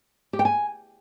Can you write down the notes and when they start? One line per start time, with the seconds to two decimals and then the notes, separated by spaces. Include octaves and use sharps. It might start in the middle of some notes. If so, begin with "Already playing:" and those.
0.33 G4
0.39 G5
0.45 G#5